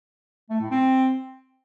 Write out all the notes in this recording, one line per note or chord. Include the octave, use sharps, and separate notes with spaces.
A3
A2
C4